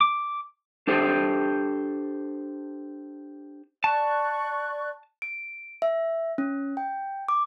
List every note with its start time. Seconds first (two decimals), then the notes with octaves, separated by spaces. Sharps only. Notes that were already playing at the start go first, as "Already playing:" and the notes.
0.01 D6
0.87 D4 G4 A4 C5
3.84 D5 A5 C#6 F#6
5.22 D7
5.82 E5
6.38 C#4
6.77 G5
7.29 D6